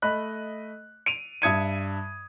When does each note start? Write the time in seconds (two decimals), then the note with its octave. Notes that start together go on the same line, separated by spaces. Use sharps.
0.02 A3 D#5 B5 F#6
1.06 D7 D#7 F7
1.42 G2 E5 D#6 G#6 C#7 D#7